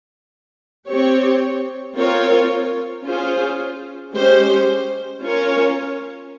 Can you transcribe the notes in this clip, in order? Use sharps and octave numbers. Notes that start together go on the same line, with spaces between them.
C4 G4 C#5
C4 F4 A#4 C#5
C#4 F4 G#4 C5
G#3 C#4 G4 C5
C#4 F4 A#4 C#5